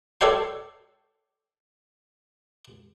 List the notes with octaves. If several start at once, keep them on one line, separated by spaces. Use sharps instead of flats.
A4 C#5 D5 G5 C6